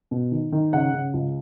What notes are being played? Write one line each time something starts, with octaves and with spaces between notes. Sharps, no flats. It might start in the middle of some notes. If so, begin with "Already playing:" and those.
B2
D#3
D#3
C#3 F#5
C#3
C#2